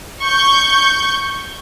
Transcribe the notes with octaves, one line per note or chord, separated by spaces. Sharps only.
C#6 G6